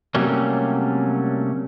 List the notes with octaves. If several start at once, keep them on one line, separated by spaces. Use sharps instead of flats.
C3 F#3 G3 A3 A#3 C#4